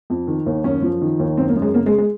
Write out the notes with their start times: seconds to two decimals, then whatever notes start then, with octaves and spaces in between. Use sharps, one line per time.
0.10 F2
0.27 D#3
0.46 D#2
0.64 F#2 C#4
0.82 F3
1.02 D#3
1.19 D#2
1.37 F#2 C4
1.49 A#3
1.56 F#2
1.62 G#3
1.74 C#3 A#3
1.86 G#3
1.98 G#3